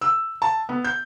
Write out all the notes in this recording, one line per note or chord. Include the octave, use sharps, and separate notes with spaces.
E6
A5
B3
G6